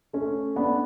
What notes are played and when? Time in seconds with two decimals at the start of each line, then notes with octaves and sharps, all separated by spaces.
0.13 A3 C#4
0.56 B3 D4